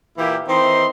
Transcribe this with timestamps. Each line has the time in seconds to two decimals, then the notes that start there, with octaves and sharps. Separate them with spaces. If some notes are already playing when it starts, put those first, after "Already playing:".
0.18 A#2 E3 A#3 E4 G4
0.48 D#3 E3 C4 D#4 C6